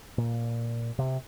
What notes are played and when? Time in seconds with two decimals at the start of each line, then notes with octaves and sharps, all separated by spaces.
0.18 A#2
0.99 C3